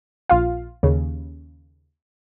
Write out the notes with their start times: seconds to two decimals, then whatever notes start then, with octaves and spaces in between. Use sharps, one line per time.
0.29 A#1 F4 F5
0.83 D#2 C#3